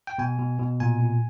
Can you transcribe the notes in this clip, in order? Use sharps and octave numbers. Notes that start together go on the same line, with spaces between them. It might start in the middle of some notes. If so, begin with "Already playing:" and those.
G5
B2 G#5
B2
B2
A#2 G#5
A#2